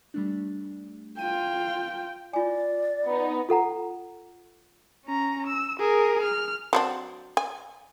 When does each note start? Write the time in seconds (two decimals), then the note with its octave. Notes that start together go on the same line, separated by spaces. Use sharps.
0.14 G3 A3 D4
1.19 F4 G5 D#7
2.33 F4 D5 G#5
3.05 B3 D#4
3.49 F4 A4 F#5 A#5
5.05 C#4 A#5
5.47 E6
5.79 G#4 A#4
6.23 F6
6.73 F#3 C4 D4
7.37 G#5